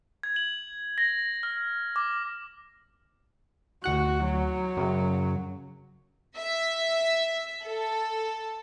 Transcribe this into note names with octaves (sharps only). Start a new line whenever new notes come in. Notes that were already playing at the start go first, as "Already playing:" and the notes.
G#6
F#7
A#6
F6
D6
D2 F#4 F#5 F#6
F#3
F#2 C#3
E5
A4